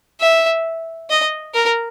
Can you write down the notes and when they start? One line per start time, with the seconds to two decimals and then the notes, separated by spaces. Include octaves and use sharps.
0.21 E5
1.10 D#5
1.54 A#4